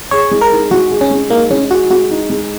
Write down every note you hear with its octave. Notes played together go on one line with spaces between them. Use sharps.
G#4 C#5
G#3
A#4
D#4
G#3 F#4
G#4
C#4
G#3
A#3 D#4
G#3 C#4
F#4 G#4
G#3 F#4
D#4
G#3